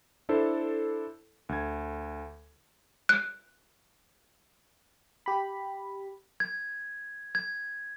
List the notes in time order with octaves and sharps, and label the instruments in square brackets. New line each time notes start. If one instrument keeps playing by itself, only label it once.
[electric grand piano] D4 E4 A4 C5
D2 G#6
[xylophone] F#6
[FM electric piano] G4 B5
[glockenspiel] G#6
G#6